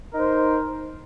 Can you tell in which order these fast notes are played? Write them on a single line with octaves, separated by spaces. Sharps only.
A#4 D#4 C5